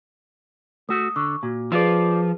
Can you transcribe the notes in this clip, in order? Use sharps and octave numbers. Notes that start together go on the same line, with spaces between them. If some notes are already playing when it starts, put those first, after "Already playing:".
A3 F#4 D#6
D3 C#6
A#2 F#4
F3 E4 F4 G#4 B4 D5 F5